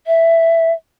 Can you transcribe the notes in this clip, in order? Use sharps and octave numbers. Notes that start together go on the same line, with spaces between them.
E5